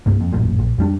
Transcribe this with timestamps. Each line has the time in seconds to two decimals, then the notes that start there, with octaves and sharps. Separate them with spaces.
0.06 C2 G2 A#3
0.21 F2
0.33 E1 A1 F#2 A#2
0.59 A#1
0.78 F2 G3 D4